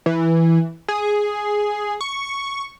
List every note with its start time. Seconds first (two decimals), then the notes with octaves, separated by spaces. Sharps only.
0.06 E3
0.88 G#4
2.01 C#6